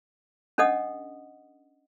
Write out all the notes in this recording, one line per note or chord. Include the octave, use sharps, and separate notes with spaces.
C#4 D4 A4 D#5 F#5 D#6